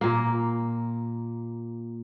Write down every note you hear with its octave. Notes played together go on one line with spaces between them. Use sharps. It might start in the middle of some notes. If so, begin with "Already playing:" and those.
A#2 A#3